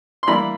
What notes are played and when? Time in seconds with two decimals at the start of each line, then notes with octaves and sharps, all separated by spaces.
0.23 C6
0.27 E3 G3 A#3 D4 B5